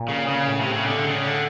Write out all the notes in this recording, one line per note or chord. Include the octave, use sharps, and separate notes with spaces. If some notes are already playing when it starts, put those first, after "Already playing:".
Already playing: A#2
C#3
C#3
A2
C3
C#3
D3
C#3
D3